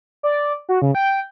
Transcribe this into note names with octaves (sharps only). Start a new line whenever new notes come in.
D5
F#4
C#3
G5